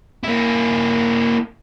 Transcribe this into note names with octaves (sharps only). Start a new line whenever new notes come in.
A#3 E4